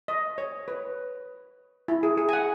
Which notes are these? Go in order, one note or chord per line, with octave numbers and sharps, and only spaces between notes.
D#5
C#5
B4
E4
G#4
G#4
G#5
F#5